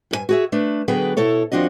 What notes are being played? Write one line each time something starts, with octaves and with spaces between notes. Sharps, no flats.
G2 A4 G#5
F#4 G#4 E5
A3 D4 B4
D3 F#3 B3 G#4 B4 G5
B2 E4 A4 C#5
D#2 F3 C4 D4 F#4 D#5